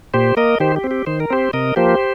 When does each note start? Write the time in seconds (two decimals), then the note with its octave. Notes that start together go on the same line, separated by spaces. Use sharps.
0.14 A#2 G4 C5
0.37 A#3 A#4 D#5
0.60 D#3 G4 C5
0.76 G4
0.84 C4
0.91 G4
1.07 D#3 C5
1.20 A#4
1.30 C4 G4 C5
1.53 C3 A#4 D#5
1.76 F3 A#3 G4 C5